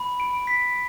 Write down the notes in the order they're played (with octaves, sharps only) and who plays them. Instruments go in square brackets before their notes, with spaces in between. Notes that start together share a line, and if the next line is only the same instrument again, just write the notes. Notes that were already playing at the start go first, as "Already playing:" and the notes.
Already playing: [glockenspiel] B5
D7
B6